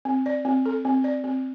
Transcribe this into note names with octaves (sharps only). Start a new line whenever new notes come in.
C4
D5
C4
A4
C4
D5
C4